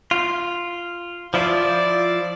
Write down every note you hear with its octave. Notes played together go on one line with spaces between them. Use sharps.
F4
F3 E4 F4 D5